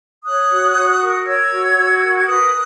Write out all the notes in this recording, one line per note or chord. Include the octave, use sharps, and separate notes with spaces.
C#5 D#6 F#6
F#4
F#4
A#4
C#5 E6 G#6
F#4
F#4
A#4
G#6
B4 D#6 F#6